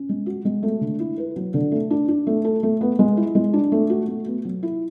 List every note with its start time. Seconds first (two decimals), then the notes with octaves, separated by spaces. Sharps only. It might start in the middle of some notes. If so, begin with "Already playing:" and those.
Already playing: C#4
0.09 G#3
0.26 F#4
0.45 G#3
0.63 A3
0.81 D3
0.99 E4
1.18 B4
1.36 F#3
1.54 D3
1.72 A3
1.91 D4
2.08 D4
2.27 A3
2.45 A4
2.63 A3
2.81 B3
2.99 G#3
3.17 E4
3.35 G#3
3.53 D4
3.72 A3
3.90 F#4
4.08 A3
4.26 B3
4.45 F#3
4.63 E4